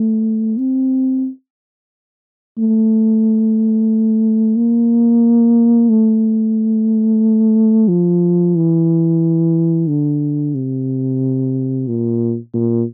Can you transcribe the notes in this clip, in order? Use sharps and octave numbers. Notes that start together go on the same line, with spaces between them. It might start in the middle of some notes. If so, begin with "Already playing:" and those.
Already playing: A3
C4
A3
A#3
A3
F3
E3
D3
C3
A#2
A#2